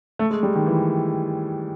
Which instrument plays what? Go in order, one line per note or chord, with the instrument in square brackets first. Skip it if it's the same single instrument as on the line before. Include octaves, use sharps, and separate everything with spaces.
[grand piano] A3
G#3
G3
D#3
E3